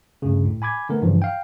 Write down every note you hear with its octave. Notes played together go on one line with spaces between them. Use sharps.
D2 G2 C#3
A2
G#5 B5 D6 G#6
D3 A3 B3 A#4
G2 C#3 E3 F3
F5 G5